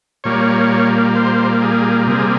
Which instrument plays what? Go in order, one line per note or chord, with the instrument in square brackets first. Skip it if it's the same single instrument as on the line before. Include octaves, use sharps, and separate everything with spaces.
[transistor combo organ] A#2 G3 A#3 C#5
C5
G#4
C3 G3 A#3 G#4